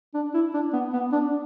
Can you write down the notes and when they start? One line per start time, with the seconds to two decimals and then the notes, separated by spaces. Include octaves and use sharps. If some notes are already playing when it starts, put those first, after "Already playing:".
0.15 D4
0.34 E4
0.54 D4
0.73 B3
0.93 B3
1.12 D4